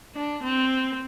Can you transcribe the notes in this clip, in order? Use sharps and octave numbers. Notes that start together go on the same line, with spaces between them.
D4
C4